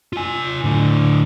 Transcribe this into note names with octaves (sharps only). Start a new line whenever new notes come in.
F4 G#5
A2 D3